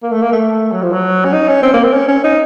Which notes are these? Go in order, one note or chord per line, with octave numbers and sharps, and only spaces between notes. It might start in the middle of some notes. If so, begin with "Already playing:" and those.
A#3
A3
A#3
A3
F#3
F3
F#3
C#4
D#4
C#4
C4
A#3
C4
C#4
C#4
D#4